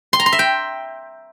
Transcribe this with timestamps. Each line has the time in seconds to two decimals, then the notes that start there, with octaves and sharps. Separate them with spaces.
0.13 C6
0.20 A#5
0.26 C6
0.33 E5
0.39 G5